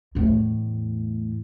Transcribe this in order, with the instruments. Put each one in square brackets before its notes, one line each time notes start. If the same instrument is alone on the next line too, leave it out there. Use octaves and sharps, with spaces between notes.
[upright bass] E2 A2